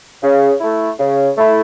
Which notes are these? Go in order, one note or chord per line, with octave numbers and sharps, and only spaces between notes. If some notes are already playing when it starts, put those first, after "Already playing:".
C#3
A3 E4
C#3
A3 E4